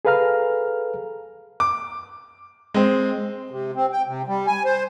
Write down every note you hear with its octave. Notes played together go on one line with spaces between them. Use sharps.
G#4 A4 B4 F5 A#5 F6
D6
G#3 C4
C3
C4
G5
C3
G3
G#5
C5